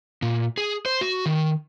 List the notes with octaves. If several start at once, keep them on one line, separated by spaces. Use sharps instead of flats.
A#2
G#4
C5
F#4
D#3